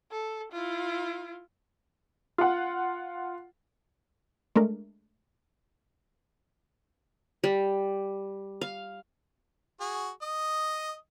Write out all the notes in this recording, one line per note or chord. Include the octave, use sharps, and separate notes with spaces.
A4
E4 F4
F4 F#5
G#3 A3 D4 A#4
G3
F5
F#4 G#4
D#5 D#6